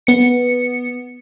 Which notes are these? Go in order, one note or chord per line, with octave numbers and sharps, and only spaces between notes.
B3 C#7